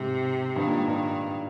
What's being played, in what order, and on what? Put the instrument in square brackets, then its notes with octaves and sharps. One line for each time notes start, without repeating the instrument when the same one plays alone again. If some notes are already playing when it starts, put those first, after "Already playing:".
Already playing: [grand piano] G#2 [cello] C3
[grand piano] G2 [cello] D#3
[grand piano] A#2
G#2
G2